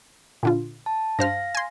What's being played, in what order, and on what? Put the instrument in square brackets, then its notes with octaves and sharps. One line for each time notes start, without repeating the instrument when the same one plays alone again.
[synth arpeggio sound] A#2 D3 F4
[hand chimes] A5
[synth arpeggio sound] G2 C5 F6 [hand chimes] F5 A#6
[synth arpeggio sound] G#5 C6